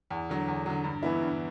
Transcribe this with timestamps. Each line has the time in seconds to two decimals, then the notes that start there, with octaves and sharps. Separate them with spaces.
0.11 E2
0.29 D3 F#3
0.48 E2
0.66 D3 F#3
0.84 G2
1.03 E3 B3 E4
1.22 G2